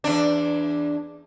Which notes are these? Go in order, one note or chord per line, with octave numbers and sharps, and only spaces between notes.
E2 D4